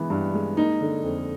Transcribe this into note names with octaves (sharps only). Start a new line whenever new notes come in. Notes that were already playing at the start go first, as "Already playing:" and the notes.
Already playing: E3 G#3 B3
G2
G#3
A#3 D#4
D3
F2